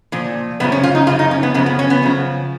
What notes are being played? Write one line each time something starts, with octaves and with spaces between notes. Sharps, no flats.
A#2 F3
F#2 C#3 F3 B3
C#4
F4
D#4
F#2 C#3 F3 F4
D#4
C#4
B3
F#2 C#3 F3 B3
B3
C#4
B3
F#2 C#3 F3